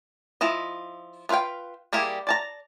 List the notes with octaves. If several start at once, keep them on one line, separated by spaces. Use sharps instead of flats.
F3 E4 F4 D#5
B3 F4 B4 F5 G5
G3 A#3 E4 G4 G#4
D5 A5 A#5